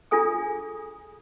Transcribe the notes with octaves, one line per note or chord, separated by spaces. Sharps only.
D4 F4 G#4 A4 G#5 D#6